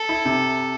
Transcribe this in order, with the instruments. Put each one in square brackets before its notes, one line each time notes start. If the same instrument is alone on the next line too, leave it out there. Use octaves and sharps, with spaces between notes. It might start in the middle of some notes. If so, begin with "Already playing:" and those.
Already playing: [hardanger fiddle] A4
[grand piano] E4
C3